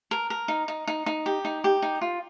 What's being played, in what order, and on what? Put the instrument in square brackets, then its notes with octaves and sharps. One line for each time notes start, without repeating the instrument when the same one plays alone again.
[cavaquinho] A#4
A#4
D#4
D#4
D#4
D#4
G4
D#4
G4
D#4
F4